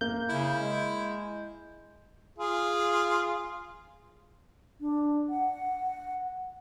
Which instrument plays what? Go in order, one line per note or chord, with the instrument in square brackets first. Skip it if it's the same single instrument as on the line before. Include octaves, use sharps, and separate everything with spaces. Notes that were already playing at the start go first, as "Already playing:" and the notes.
[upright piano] A#3 [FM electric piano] G6
[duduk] C#3 [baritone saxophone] E4
[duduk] G#3
[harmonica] F4 G#4
[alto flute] D4
F#5